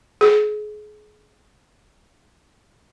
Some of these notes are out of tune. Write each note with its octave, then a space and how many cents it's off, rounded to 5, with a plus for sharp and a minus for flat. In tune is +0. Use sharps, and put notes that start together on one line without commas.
G#4 +30